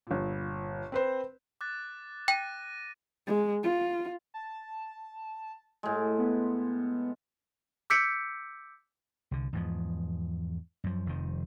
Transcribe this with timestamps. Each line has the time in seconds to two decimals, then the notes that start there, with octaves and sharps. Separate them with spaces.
0.07 G1 A#2
0.92 C4 B4 C5
1.61 D6 F#6 A6
2.28 G5 A#6 D#7
3.27 G#3
3.63 F4
4.34 A5
5.83 A2 G#3
6.18 B3
7.90 D6 E6 G6 B6 C#7 D7
9.31 C2 D3
9.53 E2 G#2 F3
10.84 F#2 F3
11.06 F1 F2 D#3 F3